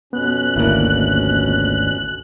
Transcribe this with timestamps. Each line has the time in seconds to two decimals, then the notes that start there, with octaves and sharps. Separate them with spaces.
0.13 F2 B2 B3 C#4 F#6
0.56 G#1 D2 D3 A#3 E4